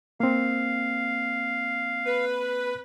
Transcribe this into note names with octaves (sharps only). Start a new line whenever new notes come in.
A#3 C4 F5
B4